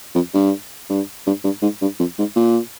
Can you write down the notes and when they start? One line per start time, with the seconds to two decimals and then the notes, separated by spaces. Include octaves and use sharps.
0.15 F2
0.34 G2
0.90 G2
1.26 G2
1.44 G2
1.62 G#2
1.81 G2
1.99 F2
2.19 G#2
2.36 A#2